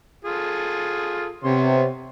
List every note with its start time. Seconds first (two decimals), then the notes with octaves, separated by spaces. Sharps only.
0.25 F4 G#4 A4
1.44 C3 B3 C#5 C6